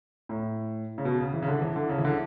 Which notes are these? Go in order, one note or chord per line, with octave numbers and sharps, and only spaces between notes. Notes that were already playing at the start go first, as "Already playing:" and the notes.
A2
C#3
B2
C#3
E3
C#3
D3
E3
D3
C#3
E3
D3